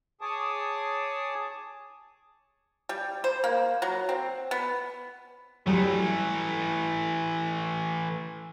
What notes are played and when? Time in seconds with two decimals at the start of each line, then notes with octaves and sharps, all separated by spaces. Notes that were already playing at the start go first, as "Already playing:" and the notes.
0.21 G#4 C#5 G#5 A5 D6 D#6
2.89 G3
3.24 C5
3.44 A#3
3.82 F#3
4.09 C4
4.51 B3
5.67 E3 F#3 G3 A3